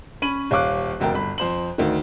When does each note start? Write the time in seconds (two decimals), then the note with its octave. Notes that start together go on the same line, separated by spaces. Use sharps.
0.22 C#4 B5 D#7 F#7
0.51 D#1 C#5 F5 D6 F#6
1.00 F1 D2 A#4 G5
1.14 G1 B5
1.38 F2 C5 F#7
1.78 D2 D#3